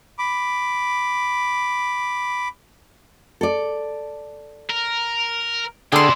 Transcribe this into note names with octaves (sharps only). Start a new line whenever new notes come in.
B5 D6
A4 D5
A#4
D3 G#3 E4 G#4 D5 G5 C6